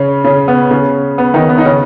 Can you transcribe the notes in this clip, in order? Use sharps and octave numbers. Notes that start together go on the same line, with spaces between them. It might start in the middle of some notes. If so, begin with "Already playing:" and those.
Already playing: C#3 C#4
C#3 C#4
B3
C#3 C#4
B3
D#3 D#4
B3
D#4
C#3 C#4